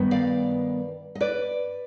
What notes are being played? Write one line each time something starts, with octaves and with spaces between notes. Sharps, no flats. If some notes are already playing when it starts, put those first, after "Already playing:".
Already playing: G2 D#3 B3
D5 F5
D#5
B4 D5